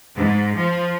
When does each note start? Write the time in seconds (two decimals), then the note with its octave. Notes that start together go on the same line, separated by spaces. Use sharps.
0.15 G#2
0.55 F3